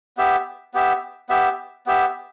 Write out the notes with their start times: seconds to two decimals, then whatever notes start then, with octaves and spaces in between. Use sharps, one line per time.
0.17 B3 G4 E5
0.74 B3 G4 E5
1.29 B3 G4 E5
1.86 B3 G4 E5